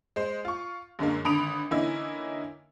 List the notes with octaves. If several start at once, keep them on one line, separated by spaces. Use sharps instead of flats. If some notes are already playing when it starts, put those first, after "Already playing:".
G#3 C5
F4 C#6
F#2 D3 G#3 A#3
G#1 D3 B5 D#6 D7 F7
D3 E3 A#3 C#4 D#4 E4